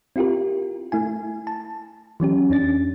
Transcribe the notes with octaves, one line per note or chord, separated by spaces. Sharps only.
C4 E4 F4 G4 A#4
A3 E4 G#5
A5
E3 F#3 C#4 G4
F2 C#4 D4 A6